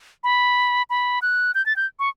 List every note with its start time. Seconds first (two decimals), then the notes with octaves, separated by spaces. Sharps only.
0.24 B5
0.90 B5
1.22 F#6
1.55 G6
1.66 A6
1.76 G6
1.99 C#6